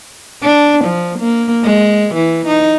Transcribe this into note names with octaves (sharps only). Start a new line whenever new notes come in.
D4
F3
A#3
G#3
E3
D#4